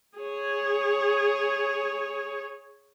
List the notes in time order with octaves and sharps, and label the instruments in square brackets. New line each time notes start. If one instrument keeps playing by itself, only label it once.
[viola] G#4 C#5